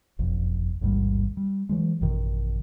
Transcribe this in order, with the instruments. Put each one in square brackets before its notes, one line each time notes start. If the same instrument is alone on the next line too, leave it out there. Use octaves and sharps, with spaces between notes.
[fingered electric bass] F#1 B1 F2
A1 D#2 G#2 G3
G3
E3 F#3 G#3
A1 F#2 B2 D#3